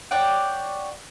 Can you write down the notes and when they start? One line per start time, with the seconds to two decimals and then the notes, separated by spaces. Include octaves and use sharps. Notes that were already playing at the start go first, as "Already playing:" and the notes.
0.11 C#5 D5 F#5 G5